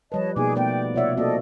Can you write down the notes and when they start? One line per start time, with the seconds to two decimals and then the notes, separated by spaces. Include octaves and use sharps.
0.12 F3 G3 B4 C#5 D#5 A5
0.36 B2 A#3 D#4 G#4 G#5 D6
0.55 A3 B3 D5 G5
0.94 C3 F4 C#5 D5 E5 F#5
1.17 A#3 C4 F#4 A4 D5 D#5